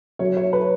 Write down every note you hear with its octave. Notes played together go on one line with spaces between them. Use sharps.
F#3 C#5
C#5
B4